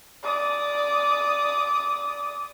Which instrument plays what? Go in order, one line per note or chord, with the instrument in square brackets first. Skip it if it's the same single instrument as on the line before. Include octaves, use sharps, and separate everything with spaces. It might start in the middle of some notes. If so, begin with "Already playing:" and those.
[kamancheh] D5 D#6